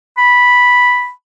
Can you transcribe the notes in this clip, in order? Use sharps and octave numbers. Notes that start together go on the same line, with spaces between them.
B5